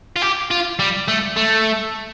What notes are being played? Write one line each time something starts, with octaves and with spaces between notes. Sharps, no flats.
F4
G4
F4
G3
A3
A3